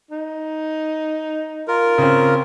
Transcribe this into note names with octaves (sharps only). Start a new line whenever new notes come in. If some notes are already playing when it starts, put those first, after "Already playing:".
D#4
F4 A#4
C#3 C4